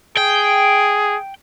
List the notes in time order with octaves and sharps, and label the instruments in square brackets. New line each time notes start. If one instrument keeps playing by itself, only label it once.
[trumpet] G#4 [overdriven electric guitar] G5